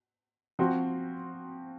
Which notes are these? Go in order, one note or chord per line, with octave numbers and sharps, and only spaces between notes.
F3 C4 F#4